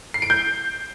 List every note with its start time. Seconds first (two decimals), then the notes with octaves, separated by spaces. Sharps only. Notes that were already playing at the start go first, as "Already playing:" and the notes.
0.14 C7
0.22 D7
0.30 G6